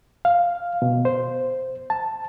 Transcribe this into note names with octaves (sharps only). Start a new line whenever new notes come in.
F5
B2
C5
A5